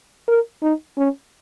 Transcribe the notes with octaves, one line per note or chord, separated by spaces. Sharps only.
A#4
D#4
C#4